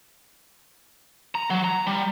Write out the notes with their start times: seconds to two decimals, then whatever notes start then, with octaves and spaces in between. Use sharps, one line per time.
1.35 A#5
1.50 F#3
1.64 A#5
1.87 G3